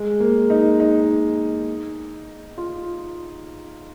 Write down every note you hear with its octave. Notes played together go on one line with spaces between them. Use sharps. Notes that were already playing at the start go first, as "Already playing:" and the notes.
Already playing: G#3
A#3
D#4
D#4
F4